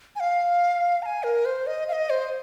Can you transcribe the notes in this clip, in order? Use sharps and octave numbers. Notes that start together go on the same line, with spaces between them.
G#5
F5
A#5
G#5
A#4
C5
D#5
F5
D#5
C5